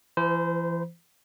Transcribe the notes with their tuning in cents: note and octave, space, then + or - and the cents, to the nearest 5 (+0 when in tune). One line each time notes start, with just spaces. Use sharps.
E3 +30 C5 -25 B5 -40